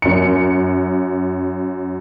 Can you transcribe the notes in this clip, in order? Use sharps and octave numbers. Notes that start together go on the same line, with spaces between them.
F#2 C#7